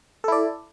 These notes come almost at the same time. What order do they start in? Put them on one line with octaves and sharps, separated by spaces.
A4 E4 D5